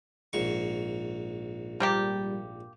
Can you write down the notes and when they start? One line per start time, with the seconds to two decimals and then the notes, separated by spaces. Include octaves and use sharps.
0.33 A#1 G#2 C#6
1.80 F3 G3 A#3 G4